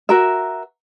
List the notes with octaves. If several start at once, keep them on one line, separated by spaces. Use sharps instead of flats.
F#4 A#4 E5